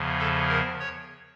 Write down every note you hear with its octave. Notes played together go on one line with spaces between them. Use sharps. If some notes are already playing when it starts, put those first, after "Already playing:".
Already playing: E2 C#3 F3
A4
A#4
C#5